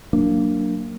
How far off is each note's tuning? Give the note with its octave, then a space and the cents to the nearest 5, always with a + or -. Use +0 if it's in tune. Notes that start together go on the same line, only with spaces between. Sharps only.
F#3 +0 A#3 -10 D4 +0